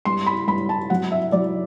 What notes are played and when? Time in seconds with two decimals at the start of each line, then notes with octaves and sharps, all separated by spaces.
0.05 G2 C6
0.26 B5
0.47 G2 B5
0.69 A5
0.90 F#3 F#5
1.12 E5
1.32 F#3 D5